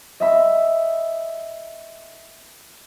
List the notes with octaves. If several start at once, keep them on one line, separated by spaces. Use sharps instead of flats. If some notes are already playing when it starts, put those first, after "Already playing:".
D#5 E5 B5